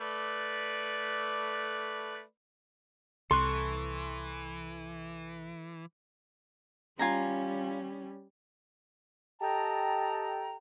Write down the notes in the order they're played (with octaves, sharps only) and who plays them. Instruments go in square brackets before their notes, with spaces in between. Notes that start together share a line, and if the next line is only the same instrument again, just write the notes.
[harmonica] A3 B4 D5
[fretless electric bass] C2 [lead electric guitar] E3 [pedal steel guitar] A4 C#6 F#6 [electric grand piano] C6
[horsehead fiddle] G3 C#4 [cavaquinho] F4 G#5 A#5
[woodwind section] G4 A4 D#5 G5 A5 A#5